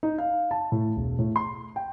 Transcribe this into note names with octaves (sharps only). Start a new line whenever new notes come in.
D#4
F5
A5
A2
E1
A2
C6
G5